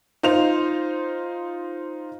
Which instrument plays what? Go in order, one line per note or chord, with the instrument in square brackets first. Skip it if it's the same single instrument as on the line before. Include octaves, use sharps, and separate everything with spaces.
[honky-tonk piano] D#4 F4 C5 F7